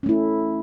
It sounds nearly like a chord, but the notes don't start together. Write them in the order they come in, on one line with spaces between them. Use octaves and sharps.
C#4 A3 E4